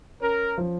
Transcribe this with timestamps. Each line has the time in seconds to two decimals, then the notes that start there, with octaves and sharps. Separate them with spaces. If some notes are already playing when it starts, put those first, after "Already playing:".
0.21 C#4 A#4
0.58 F3